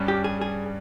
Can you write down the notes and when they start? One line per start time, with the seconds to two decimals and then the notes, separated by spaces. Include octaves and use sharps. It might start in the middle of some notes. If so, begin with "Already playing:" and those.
Already playing: G2 G3 C#4
0.08 G4
0.24 G#4
0.41 G#4